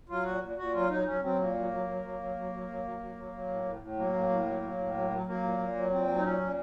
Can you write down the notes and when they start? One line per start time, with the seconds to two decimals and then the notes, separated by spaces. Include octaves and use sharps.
0.09 F#3 F4
0.25 A#2 F#4
0.41 A#2
0.58 A#2 F#4
0.74 F#3 F4
0.89 F#3 D#4
1.06 F#3 C#4
1.22 F#3 C4
1.38 A#2 A#3
1.55 F#3
1.70 F#3
1.86 F#3
2.02 F#3
2.19 F#3
2.35 F#3
2.52 F#3
2.68 F#3
2.84 F#3
2.99 F#3
3.16 F#3
3.33 F#3
3.48 A2
3.64 A2
3.81 A2
3.97 F#3 A#3
4.13 A2
4.29 A2
4.45 F#3
4.62 F#3
4.78 A2
4.94 F#3
5.10 F#3
5.26 F#3 A#3
5.42 A#2
5.58 A#2
5.75 F#3
5.90 A#2 C4
6.07 F#3
6.17 D#4
6.23 A#2 C#4
6.40 A#2